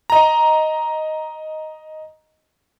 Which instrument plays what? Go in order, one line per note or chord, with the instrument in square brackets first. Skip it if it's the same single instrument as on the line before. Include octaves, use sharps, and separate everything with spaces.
[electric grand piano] D#5 A#5